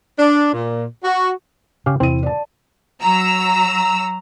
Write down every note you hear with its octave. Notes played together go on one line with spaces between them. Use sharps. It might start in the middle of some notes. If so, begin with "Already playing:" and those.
D4
A#2
F#4
C#3 C#4 G4 F5
E2 C3 E3 C4 E4 D#7
D5 A5
F#3 A#5 E6